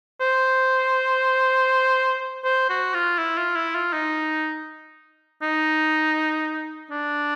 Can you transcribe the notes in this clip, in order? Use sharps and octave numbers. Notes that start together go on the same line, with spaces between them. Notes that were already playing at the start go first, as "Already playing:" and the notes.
C5
C5
F#4
F4
E4
F4
E4
F4
D#4
D#4
D4